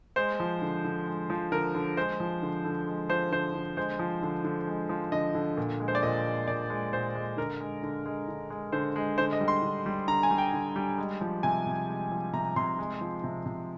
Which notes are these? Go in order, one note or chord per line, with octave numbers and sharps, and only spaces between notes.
G#3 C5
F3
D3
D3
G#3
F3
D3 A#4
D3
G#3 C5
F3
D3
D3
G#3
F3 C5
D3 C5
D3
G#3 C5
F3
D3
D3
G#3
F3
D3 D#5
D3
A#2
G#3
C5
D5
A#2 D#5
G#3
A#2 D5
G#3
A#2 C5
G#3
D3 A#4
G#3
D3
G#3
D3
G#3
D3 C5
G#3
D3 C5
D#5
G3
C6
D3
G3
D3 A#5
G#5
G3
G5
D3
G3
G#3
F3
C3 G#5
C3
G#3
F3
C3 A#5
C3 C6
G#3
F3
C3
C3